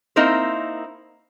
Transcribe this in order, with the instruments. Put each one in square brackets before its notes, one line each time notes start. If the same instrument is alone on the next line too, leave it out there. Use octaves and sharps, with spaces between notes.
[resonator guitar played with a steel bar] A#3 C4 D#4 E4 A#4 C5